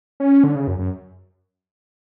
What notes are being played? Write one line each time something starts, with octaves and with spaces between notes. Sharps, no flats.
C#4
D3
C#3
F#2
F#2